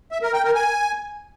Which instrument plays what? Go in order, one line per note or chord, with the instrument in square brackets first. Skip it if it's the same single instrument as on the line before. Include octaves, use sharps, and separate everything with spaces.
[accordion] E5
A#4
G5
A#4
G#5